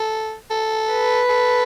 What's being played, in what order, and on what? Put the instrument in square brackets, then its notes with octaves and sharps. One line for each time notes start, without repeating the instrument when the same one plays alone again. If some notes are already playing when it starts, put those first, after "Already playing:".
Already playing: [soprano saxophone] A4
A4
[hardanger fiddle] B4
[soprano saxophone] A4